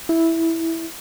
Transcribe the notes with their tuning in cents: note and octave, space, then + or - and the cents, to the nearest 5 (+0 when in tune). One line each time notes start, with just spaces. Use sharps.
E4 -5